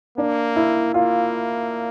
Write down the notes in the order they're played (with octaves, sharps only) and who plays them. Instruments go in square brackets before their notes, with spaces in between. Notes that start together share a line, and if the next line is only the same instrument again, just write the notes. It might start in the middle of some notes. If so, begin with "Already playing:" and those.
[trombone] A#3 [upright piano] D4
[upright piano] E4
[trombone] A#3 [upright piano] F4